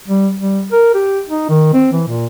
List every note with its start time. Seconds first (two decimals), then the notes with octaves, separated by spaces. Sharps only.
0.08 G3
0.39 G3
0.72 A#4
0.94 G4
1.29 D#4
1.49 D#3
1.74 C4
1.93 E3
2.07 A#2